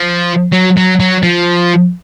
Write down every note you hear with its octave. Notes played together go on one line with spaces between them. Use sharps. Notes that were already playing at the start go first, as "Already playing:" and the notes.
Already playing: F3
F#3
F#3
F#3
F3